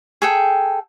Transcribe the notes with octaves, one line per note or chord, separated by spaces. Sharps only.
G#4 A4 G5